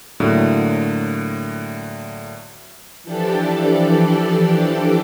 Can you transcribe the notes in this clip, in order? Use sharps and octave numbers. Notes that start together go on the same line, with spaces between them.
A2 D3 F#3 A#3
E3 F3 D4 G4 A4 D5